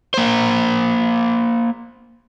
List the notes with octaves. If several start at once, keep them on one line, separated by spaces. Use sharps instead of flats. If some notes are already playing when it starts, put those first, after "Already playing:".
A#3 C5